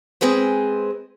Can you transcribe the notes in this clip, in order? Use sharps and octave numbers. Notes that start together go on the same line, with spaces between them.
G#3 C4 G#4 B4 C5